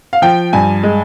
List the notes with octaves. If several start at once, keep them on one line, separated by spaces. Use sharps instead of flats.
F5
F3 G5
G2 G#5
G#3